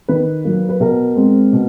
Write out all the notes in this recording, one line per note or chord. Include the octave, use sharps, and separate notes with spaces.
D#3 B4
F#3 A#3
B4
B2 A#4
G#3 C4
B2